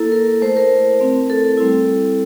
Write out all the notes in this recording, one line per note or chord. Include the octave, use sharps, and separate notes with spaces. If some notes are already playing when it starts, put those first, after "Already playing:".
Already playing: A#3 E4 A4
A#4
A3 E4 C5
A#4
A3 C4 E4
A4
G3 C4 E4